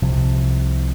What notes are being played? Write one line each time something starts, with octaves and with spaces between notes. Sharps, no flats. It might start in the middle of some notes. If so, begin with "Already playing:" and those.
C2 C3 F3